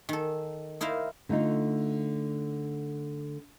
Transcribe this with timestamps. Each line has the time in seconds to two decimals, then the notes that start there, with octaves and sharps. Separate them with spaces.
0.09 D#3 A4
0.81 D#4 E4 A#4 C5 F5
1.29 D3 A3 D#4 F4